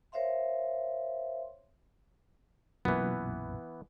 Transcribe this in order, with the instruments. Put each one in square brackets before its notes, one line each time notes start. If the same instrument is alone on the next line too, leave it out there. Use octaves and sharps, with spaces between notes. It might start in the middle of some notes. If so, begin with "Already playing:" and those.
[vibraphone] A#4 C5 C#5 E5 F5 C6
[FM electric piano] B1 F#2 A#2 [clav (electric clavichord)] E3 B3